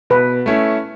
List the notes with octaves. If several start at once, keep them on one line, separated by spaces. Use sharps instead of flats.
B2 B4
A3 C#4 E4